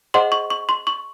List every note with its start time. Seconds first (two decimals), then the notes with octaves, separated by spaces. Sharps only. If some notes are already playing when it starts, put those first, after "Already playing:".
0.14 G#4 C5 D#5 F#5 C6
0.32 C#6
0.50 C#6
0.69 C6
0.87 C#6